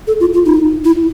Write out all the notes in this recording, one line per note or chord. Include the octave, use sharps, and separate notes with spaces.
A4
F4
F4
D#4
E4